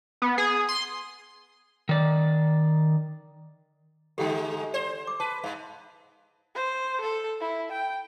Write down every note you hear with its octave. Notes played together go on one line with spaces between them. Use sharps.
B3
G#4
C6
D#3 D5
G#2 D3 G#3 G4 A4 F#5 G5
C5 D5
D6
B4 A5
G#2 F5
C5
A4
E4
G5